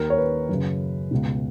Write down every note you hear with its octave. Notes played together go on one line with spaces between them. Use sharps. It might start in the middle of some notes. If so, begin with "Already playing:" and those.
Already playing: D#2 D#3 A#4
C#5
B4
F#2 C#3
C#2 B2